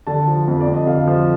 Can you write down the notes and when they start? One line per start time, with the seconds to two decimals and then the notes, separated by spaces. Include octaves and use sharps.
0.07 D3 A5
0.28 F3
0.48 F2
0.60 D5
0.68 F2
0.74 D#5
0.87 D3 F5
1.07 F3